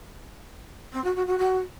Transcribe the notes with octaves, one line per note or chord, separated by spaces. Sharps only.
C4
F#4
F#4
F#4
F#4